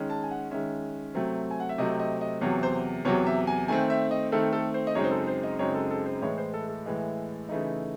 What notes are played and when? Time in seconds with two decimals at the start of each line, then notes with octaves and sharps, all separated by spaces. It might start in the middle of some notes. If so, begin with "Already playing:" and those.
Already playing: D#3 G#3 C#4
0.10 A5
0.23 G#5
0.31 F#5
0.51 D#3 G#3 C#4 E5
1.15 C3 F#3 A3 C4
1.51 G#5
1.60 F#5
1.69 E5
1.78 C3 F#3 A3 C4 D#5
2.00 D#5
2.21 D#5
2.41 E2 C3 F#3 C#5
2.63 C5
3.05 E2 C3 F#3 C#5
3.26 E5
3.47 G#5
3.68 D#3 A3 C4 G#5
3.90 E5
4.11 D#5
4.32 D#3 A3 C4 A4
4.53 A4
4.74 C5
4.87 D#5
4.95 F#2 C#3 G#3 C4 D#4 C#5
5.04 C5
5.11 A4
5.28 C5
5.43 D#5
5.59 F#2 C#3 G#3 C4 D#4 C#5
5.74 A4
5.91 A4
6.06 C5
6.22 A2 E3 G#3 C#5
6.38 C5
6.54 A4
6.69 A4
6.86 A2 E3 G#3
7.49 C#3 E3 A3 D#4